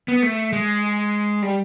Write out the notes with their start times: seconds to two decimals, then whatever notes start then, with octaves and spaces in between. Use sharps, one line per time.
0.08 B3
0.23 A3
0.53 G#3
1.42 G3